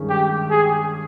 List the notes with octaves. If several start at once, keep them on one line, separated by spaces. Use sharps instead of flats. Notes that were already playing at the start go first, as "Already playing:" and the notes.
Already playing: G2 D#3 G#3 C#4
G4
G#4